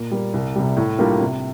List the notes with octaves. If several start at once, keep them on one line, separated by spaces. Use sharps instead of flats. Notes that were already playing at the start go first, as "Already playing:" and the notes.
Already playing: A#2
G3 A#3
C2
C3 G3
A2
G3 A#3 D4 F4
C3